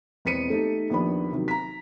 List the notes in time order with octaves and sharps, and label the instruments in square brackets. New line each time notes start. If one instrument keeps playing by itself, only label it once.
[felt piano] E1 B3 C4 B6 C#7 D#7
A3 D#4 G4 A4
A#1 D#2 B3 D4 B5
C3 D#3 F#3
A#5 B6